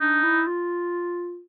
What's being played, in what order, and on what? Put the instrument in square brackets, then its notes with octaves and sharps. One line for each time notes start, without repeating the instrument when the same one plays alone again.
[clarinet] D4 [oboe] D#4
[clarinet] E4
F4